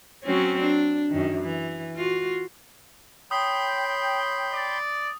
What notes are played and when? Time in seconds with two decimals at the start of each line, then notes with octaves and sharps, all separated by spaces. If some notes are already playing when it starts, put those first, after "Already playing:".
0.23 F#3 C4 C#4
0.61 D4
1.10 F#2 D#3
1.41 E3
1.96 F4 F#4
3.31 C#5 G5 B5 C6 D#6 G6
4.53 D5